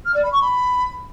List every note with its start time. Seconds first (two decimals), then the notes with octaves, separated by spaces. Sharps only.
0.05 F6
0.14 D5
0.23 B5
0.32 C#6
0.41 B5